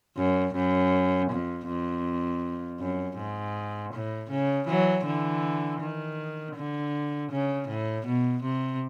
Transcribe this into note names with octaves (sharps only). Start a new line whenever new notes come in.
F#2
F#2
F2
F2
F#2
G#2
A2
C#3
E3 F#3
D3 E3
D#3
D3
C#3
A2
B2
C3